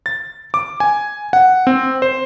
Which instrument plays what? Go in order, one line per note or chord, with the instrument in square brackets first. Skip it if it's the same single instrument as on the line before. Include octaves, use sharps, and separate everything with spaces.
[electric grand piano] A6
D6
G#5
F#5
C4
C5